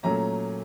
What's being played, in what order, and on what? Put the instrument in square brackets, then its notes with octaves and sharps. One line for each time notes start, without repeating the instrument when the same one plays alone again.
[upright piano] A#2 F#3 A3 C#4 A#5